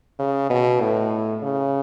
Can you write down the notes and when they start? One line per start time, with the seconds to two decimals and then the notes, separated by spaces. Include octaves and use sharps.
0.19 C#3
0.50 B2
0.81 A2
1.43 C#3